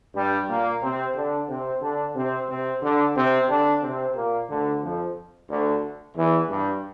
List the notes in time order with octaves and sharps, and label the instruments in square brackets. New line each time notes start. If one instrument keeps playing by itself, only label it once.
[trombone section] G2 G3
A#2 A#3
C3 C4
D3 D4
C3 C4
D3 D4
C3 C4
C3 C4
D3 D4
C3 C4
D3 D4
C3 C4
A#2 A#3
D2 D3
F2 F3
D2 D3
E2 E3
G2 G3